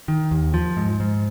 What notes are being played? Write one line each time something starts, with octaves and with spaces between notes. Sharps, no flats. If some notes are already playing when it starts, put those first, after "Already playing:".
D#3
D#2
F3
G#2
G#2